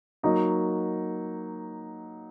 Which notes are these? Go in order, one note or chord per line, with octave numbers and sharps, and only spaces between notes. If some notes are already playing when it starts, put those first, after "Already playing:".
F#3 A#3 D#4 F#4 D#5